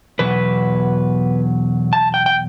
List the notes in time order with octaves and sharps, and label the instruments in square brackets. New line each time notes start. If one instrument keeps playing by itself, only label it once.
[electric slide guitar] E2 B2 F#3 B4
A5
G5
G5